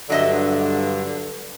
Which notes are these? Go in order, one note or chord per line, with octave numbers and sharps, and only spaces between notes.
G2 D3 F#3 D#5 E5